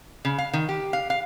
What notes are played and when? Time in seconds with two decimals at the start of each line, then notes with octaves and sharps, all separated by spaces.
0.25 C#3
0.38 F5
0.53 D#3
0.69 G4
0.93 F5
1.10 F5